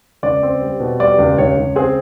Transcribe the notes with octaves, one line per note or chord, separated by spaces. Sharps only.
C#2 D5
C4
G3
B2
G3 D5
C#2
C#2 C#5
C#2
C4 G#4